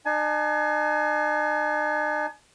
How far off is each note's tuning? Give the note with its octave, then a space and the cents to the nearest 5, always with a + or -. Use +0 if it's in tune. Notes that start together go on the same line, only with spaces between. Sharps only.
D#4 -45 G#5 +35